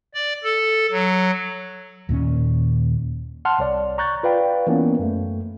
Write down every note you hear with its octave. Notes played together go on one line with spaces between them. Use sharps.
D5
A4
F#3
D#2 A#2 A3 C#4
F#5 A5 C6 F6
C2 C#5 D5
A#5 C#6 F#6 G6 A6
F4 B4 D5 F5 G5
E3 A#3 B3 C#4
F#2 A3